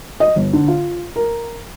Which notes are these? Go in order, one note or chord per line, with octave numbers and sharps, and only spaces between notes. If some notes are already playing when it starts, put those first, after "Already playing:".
D#5
G1
D3
F4
A#4